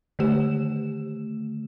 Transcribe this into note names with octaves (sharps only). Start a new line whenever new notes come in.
D3 D#3 A3 G4 E7